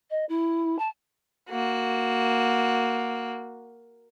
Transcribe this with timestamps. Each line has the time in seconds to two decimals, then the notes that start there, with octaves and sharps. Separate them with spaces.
0.10 D#5
0.29 E4
0.79 A5
1.50 A#3 F#4